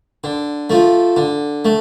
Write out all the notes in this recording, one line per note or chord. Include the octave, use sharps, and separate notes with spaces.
D3
F3 A3
D3
A3